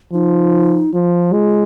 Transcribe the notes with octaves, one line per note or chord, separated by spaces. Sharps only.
F3 D#4
F3 F4
G#3